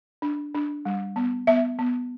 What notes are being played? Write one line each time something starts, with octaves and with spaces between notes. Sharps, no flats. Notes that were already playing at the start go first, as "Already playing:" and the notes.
D4
D4
G3
B3
B3 E5
B3